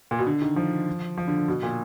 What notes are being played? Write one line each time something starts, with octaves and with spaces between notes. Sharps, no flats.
A#2
B2
D3
D#3
F3
F3
D3
D3
B2
A#2